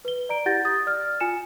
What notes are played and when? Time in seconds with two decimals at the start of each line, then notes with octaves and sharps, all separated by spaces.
0.05 B4 G7
0.29 D5 A#5 D7
0.45 E4 G4 F#5 G6 A6 A#6
0.65 D#6 A6
0.87 D5 F6
1.20 F4 G#5 C#7 E7